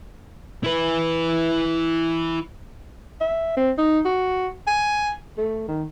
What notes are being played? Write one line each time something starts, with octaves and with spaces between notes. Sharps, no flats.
E4 B4
E5
C4
D#4
F#4
G#5
A3
D#3